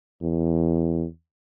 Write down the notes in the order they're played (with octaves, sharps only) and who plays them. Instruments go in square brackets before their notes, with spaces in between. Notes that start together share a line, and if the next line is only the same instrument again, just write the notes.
[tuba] E2